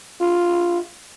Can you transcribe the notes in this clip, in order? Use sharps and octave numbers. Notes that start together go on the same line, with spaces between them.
F4